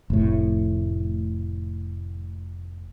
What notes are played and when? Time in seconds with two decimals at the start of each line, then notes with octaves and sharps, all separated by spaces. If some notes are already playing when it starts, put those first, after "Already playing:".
0.10 F1 A2